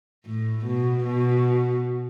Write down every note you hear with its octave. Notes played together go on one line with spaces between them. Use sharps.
A2
B2
B2